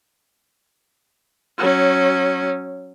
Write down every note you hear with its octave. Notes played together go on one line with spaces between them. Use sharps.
F#3 C#4